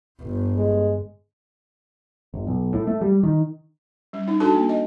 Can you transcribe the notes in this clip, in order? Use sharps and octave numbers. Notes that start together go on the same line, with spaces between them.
G1
G#3
G1
B1
A2
A3
G3
D#3
G3 C#4
D#4
D4 F#4 A4 A5
A#3
D#5